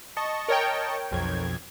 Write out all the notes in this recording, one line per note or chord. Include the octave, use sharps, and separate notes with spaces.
D#5 A5 C#6
A#4 C#5 G5
B1 F2 G#6